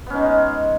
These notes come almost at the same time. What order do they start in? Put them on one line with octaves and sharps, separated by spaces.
B3 C#4 D#4 G#3